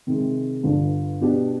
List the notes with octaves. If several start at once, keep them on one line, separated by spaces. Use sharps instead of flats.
C3 D#3 G#3
G1 G2 D3
B2 B3 D4 G4